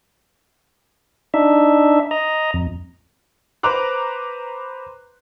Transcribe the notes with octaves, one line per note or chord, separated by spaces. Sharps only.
D4 D#4 E5
D#5 A#5
F2
B4 C5 A#5 D6 F#6